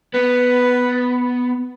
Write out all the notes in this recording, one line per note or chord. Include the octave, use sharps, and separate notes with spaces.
B3 B4